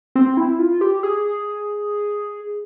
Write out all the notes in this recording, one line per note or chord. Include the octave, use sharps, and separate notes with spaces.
C4
E4
F4
G4
G#4